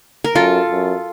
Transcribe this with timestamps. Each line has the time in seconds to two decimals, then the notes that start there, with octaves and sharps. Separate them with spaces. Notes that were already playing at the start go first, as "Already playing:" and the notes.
0.24 A#4
0.35 F#2 F4 A4
0.71 F#2